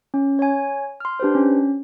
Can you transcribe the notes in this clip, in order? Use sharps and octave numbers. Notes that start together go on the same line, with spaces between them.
C#4
C#5 G#5
C6 F6
D4 G4 B4 C5
C#4